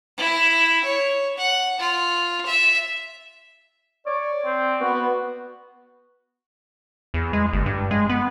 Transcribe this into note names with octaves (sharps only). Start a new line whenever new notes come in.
E4
C#5
F#5
F4
E5
C#5 D5
C4
B3 F#4
E2
G#3
G1
G2
G#3
B3